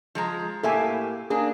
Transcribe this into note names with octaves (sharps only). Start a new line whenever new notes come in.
F3 G#3 A#5
A2 A#3 G4 A4 E5 G#5
A#3 D4 G#4